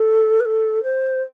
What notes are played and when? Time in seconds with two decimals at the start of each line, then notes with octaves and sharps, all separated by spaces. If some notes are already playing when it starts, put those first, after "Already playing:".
Already playing: A4
0.40 B4
0.45 A4
0.83 C5